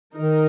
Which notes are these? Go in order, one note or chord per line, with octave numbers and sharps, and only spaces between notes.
D#3 D#4 A#4